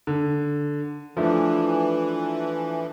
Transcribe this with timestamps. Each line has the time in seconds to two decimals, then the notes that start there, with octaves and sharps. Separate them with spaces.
0.07 D3
1.17 E3 F3 A3 D4